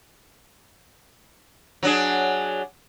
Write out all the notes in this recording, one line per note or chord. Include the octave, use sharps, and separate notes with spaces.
F#3 D4 G#4